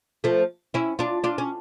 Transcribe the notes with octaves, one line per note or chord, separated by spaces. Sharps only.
F3 A3
C#4 E4
D4 F4
D4 F4
C#4